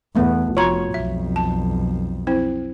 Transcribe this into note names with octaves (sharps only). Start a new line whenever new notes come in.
E2 A3 B3
F1 F4 F#4 C#5 A#5
B1 F2 E5
A5
C4 E4 C5